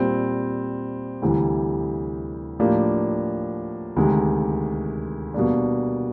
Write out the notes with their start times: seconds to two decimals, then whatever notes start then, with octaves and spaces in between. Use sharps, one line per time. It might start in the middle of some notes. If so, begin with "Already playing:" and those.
Already playing: A#2 G3 C4
1.22 D2 C3 E3 G3
2.59 A2 F3 A#3 D4 G4
3.96 D2 C3 D#3 G#3
5.34 B2 G3 A#3 D4